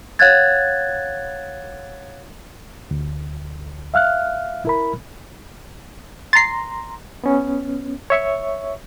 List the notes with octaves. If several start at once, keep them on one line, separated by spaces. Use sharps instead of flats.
C#5 F5 F#5 F#6 G#6 A6
D2
E5 F5 F6 F#6
E4 A#4 B5
A#5 C6 A6 C7
B3 C#4
C#5 E5 C#6